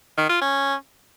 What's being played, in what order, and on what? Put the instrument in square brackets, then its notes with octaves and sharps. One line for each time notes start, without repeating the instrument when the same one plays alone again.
[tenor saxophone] D#3
F4
C#4